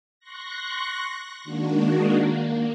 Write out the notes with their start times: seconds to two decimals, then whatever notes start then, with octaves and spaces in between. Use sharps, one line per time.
0.19 C6 C#6 F#6 A#6
1.44 D#3 G#3 A#3 D4 F#4
2.23 A#3